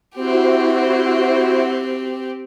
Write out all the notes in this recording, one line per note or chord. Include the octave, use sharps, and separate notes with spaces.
C4 E4 F#4 G4 C5